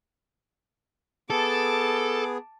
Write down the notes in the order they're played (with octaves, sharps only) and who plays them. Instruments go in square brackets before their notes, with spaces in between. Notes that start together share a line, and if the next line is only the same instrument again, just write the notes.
[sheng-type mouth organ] B3 G#4 [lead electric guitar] A4 [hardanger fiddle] A5 D6